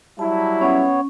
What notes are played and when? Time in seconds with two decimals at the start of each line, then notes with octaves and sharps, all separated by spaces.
0.19 F#3 G3 E4 A5
0.61 B3 C#4 C#5